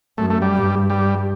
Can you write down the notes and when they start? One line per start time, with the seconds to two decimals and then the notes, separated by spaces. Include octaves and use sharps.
0.18 F#2 A3
0.30 A3
0.42 G3
0.54 G2
0.90 G3